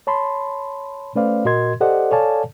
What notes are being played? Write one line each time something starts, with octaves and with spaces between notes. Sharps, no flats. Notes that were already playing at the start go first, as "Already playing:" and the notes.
C#5 A5 B5 C6
A3 C#4 B4 C5 D5 F5
A#2 F#4 A#4 D#5 C6 G#6
G4 A4 C5 D5 D#5 F#5
A4 C#5 D5 F5 G#5 A5